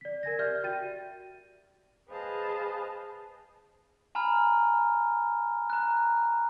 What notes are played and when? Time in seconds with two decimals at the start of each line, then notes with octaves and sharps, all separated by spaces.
0.01 D5 B6
0.23 A#4 G#5 G#6 A#6
0.39 G4 D5 E5 F6 G6
0.64 F#4 G5 A6 D#7
2.09 G#4 B4 C5 D#5 F5 A5
4.15 G#5 A#5 B5 F6
5.70 A#5 F#6